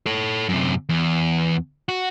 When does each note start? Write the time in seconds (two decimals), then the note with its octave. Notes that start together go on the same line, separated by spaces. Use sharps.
0.06 A4 C#5
0.49 F#2 C3
0.89 E2
1.89 F#4